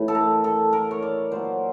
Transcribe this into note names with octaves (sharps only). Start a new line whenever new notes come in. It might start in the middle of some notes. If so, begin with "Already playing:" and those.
Already playing: A2 E3
A4
A#4
A4
A#4
C#5
D5
A#2 F#3 C5